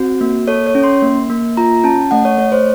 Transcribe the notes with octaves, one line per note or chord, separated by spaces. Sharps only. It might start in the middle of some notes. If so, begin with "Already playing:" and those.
Already playing: C4 F#4
A#3
A4 C#5
C#5
C#4
C6
A#3
A#3
F4 A#5
C#4 A5
A3 F#5
C#5
A3 C#5
C5